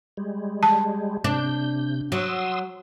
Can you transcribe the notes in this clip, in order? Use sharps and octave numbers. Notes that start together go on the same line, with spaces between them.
G3 G#3
A5
C3 D4 G6
F#3 C6 D#6 E6